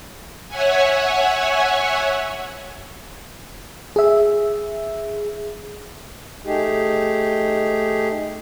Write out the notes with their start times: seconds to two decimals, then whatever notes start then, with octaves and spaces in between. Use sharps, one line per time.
0.48 C#5 E5 F#5 G#5
3.96 G#4 E5
6.46 A3 D#4 G4 G#4